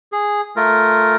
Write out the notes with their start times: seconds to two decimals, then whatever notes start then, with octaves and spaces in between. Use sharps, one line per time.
0.12 G#4
0.56 A3 F4 A#4